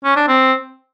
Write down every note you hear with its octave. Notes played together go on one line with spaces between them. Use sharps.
C#4
D4
C4